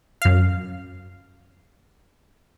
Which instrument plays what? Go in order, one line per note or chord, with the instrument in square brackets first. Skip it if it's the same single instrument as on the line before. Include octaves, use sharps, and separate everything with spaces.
[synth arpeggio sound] F#2 F5